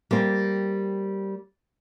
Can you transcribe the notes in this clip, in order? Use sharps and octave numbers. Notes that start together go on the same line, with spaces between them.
G3 A#3 C4